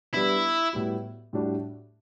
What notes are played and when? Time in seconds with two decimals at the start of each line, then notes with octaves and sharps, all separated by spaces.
0.13 G3 B3 D4 E4
0.73 A2 G3 B3 F#4
1.33 A2 G3 D4 F#4